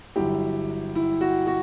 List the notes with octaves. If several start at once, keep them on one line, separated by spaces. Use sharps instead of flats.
G1 G2 F#3 E4 G4
E4
F#4
F#4